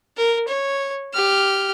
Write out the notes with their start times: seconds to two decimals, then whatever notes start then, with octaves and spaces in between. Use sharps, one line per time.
0.17 A#4
0.48 C#5
1.13 G4 F6